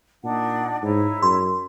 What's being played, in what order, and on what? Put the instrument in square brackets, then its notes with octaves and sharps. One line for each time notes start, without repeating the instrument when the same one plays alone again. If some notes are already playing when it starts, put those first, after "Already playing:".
[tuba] A#2 [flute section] D4 D#4 F#5
[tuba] G#2 [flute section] D#4 E4 C#5
[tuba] F#2 [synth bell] C6